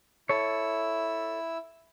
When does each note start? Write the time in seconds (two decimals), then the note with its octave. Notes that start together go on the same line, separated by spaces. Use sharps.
0.29 E4 A4 C#5 E6